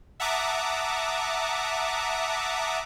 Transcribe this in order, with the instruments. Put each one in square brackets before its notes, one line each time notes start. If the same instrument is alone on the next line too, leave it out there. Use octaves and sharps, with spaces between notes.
[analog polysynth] E5 F#5 A5 A#5 D6 D#6